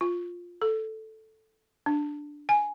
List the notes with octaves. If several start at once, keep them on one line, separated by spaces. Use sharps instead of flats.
F4
A4
D4
G#5